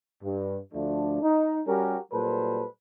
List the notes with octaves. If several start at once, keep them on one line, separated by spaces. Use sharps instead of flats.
G2
D2 F3 A3 D4
D#4
G3 C#4 F#4 G4 A#4
A#2 F#3 G3 A4 B4 C5